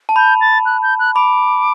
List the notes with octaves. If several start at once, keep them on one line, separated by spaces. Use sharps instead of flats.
A5
B5 G6
A6
F#6
G6
F#6
B5 D6